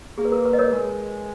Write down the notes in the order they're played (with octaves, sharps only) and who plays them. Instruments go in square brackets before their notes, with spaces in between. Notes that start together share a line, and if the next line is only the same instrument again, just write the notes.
[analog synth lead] A#3 [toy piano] G#4
[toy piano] B4
A#4
B4
D#5
A#4 C#5
[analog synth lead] G#3 [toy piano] A#4